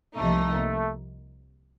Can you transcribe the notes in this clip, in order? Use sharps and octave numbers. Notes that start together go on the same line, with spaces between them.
C2 C3 F3 A3 A#3 D#4